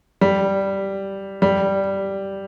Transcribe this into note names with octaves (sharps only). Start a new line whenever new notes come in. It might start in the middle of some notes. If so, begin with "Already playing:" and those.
G3
G3